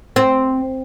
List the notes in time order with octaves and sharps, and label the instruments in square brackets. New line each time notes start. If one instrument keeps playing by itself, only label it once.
[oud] C4